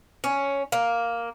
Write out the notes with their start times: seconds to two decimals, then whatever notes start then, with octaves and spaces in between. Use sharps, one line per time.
0.24 C#4
0.72 A#3